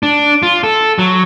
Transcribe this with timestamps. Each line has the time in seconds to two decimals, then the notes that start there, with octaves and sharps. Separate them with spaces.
0.03 D4
0.43 F4
0.63 A4
0.99 F#3